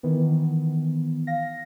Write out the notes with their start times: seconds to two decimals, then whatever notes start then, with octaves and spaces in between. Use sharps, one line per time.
0.03 D#3 E3 B3
1.27 F5 A#6